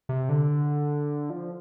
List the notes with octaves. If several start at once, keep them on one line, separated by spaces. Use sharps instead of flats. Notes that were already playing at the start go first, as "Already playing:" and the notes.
C3
D3
F3